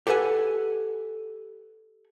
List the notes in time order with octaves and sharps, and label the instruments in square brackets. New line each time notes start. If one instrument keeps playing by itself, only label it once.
[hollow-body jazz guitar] G4 A4 B4 F#5 G#5